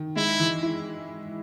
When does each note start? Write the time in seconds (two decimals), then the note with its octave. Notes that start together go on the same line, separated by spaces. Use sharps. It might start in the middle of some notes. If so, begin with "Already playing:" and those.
Already playing: D#3
0.16 G#3 E4
0.40 E3
0.63 E4